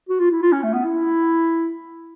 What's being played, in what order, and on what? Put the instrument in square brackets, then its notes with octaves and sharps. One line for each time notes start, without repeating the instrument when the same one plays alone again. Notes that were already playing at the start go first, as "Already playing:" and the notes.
[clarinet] F#4
F4
E4
F4
C#4
A3
B3
E4